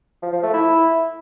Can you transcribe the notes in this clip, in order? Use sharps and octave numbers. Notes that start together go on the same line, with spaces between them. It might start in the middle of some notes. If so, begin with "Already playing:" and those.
F3
F3
A3
E4